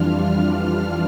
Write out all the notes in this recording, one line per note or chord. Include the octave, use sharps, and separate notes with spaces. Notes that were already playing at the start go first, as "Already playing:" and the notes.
Already playing: F2 E3 G3 D4 F4 F6